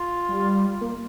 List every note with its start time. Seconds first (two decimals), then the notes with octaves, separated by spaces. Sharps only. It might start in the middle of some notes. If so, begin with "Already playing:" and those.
Already playing: F4
0.29 G3
0.81 A#3